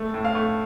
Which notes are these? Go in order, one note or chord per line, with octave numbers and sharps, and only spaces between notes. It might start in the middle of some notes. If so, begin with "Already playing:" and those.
Already playing: A3
A2
F5
A3